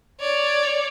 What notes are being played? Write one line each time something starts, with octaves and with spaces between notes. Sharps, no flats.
C#5 D5